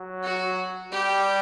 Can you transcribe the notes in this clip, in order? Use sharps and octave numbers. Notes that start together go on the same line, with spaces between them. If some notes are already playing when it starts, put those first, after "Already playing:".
Already playing: F#3
F#4
G3 G4